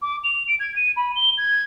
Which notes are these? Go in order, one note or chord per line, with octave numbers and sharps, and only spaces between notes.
D6
F7
D7
G#6
D#7
B5
G7
G#6